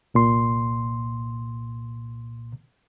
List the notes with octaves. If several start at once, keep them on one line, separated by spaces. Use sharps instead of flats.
C2 A#2 C6